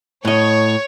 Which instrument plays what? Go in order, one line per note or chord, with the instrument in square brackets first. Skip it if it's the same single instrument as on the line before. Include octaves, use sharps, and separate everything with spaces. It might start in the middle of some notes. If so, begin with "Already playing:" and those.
[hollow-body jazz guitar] A2 D#5 [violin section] C#5